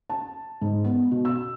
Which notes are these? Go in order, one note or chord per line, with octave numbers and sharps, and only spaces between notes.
A5
G#2
B3
B2
E6